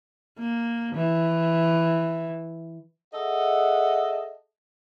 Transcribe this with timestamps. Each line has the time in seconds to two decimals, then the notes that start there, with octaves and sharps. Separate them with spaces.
0.39 A#3
0.95 E3
3.14 G#4 A4 D#5 E5 F#5